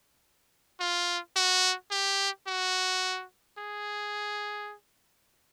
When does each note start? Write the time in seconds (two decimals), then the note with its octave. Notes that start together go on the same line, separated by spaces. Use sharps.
0.80 F4
1.36 F#4
1.91 G4
2.47 F#4
3.58 G#4